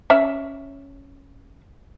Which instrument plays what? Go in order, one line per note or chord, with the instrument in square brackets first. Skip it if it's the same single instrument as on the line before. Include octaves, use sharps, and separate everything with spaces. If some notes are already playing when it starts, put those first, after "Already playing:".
[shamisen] C#4 E5